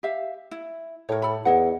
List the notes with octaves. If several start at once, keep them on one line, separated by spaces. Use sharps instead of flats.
G4 E5 F5
E4
A2 A#4 C#5
A4 B5
E2 E4 D#5 F#5